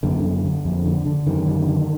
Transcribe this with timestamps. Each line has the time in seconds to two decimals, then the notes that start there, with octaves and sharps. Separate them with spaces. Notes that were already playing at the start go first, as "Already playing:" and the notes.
0.03 F#2 D3
0.24 D3
0.45 D3
0.65 F2
0.86 D3
1.06 D3
1.26 F#2 D#3
1.47 D3
1.68 D3